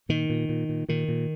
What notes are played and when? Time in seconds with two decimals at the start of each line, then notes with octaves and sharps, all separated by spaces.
0.09 A#2 D#3
0.30 A#2
0.49 A#2
0.69 A#2
0.89 A#2 D#3
1.08 A#2